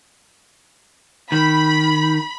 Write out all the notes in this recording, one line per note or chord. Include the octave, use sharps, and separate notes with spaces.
D#3 B5